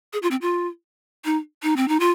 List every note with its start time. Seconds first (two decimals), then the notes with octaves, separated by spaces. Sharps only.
0.13 G#4
0.22 F4
0.31 C4
0.42 F4
1.25 D#4
1.63 D#4
1.77 C4
1.88 D#4
2.00 F4